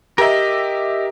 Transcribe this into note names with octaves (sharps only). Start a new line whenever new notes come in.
G4 A#4 D#5 E5